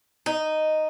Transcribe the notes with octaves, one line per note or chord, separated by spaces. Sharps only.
D#4